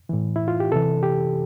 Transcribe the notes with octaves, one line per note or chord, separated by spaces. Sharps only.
A2 E3
E4
F4
G4
C3 E3 A4
G4